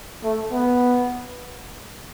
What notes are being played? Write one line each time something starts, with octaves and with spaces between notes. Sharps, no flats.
A3
B3